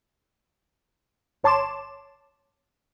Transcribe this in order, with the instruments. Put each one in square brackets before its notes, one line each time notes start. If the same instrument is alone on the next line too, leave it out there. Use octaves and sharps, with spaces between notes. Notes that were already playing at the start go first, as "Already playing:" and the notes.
[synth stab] G1 C#5 A5 C6 D6 E7